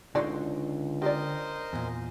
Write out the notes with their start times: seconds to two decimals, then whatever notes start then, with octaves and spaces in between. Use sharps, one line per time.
0.15 C#2 D3 D#4 F#4 C#5 D5 C6
1.02 G4 A#4 C5 D5 D#5
1.73 E2 A#2